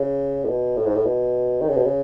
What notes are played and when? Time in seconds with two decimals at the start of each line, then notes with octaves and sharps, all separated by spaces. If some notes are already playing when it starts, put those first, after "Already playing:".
Already playing: C#3
0.44 A2
0.48 B2
0.77 A2
0.86 G#2
0.95 A2
1.05 B2
1.62 D#3
1.69 C#3
1.77 B2
1.86 C#3